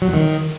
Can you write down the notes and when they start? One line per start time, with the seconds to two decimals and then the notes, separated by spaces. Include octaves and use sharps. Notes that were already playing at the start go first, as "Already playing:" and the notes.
0.02 F#3
0.08 E2
0.14 D#3